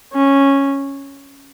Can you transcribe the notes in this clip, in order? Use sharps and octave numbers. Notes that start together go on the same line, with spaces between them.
C#4